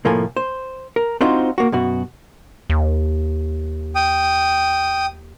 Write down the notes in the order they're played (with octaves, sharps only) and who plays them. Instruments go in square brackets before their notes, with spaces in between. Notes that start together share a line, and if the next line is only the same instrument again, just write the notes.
[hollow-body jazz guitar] C2 A2 F3 A#3 A4 G#5
C5
A#4
C4 D4 D#4 F4 F#4 C5
A#3 F#4
F#2 B2 F#4
[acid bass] D#2
[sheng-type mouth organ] G5 D#6